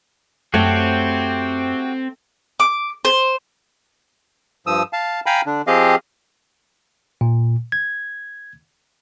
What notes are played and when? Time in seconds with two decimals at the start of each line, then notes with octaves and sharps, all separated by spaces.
0.54 F#2 A3 C4 F#4 G4 C#5
2.60 D6
3.05 C5
4.67 G2 F3 D#6 E6
4.93 F5 A5
5.26 F5 G5 G#5 A#5 B5
5.46 D3 D4
5.67 F3 C4 G4 G#4 D#5 F5
7.21 A#2
7.72 G#6